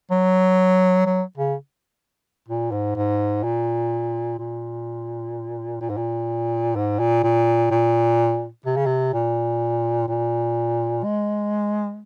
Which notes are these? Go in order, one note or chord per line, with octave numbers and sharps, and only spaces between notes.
F#3
F#3
C#3
A#2
G#2
G#2
A#2
A#2
A#2
G#2
A#2
G#2
A#2
A#2
A#2
C3
C#3
C3
A#2
A#2
G#3